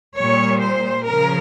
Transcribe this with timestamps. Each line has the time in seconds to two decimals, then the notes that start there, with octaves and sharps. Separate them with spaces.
0.17 A#2 G3 C#5
0.62 C5
1.07 C#3 F3 A#4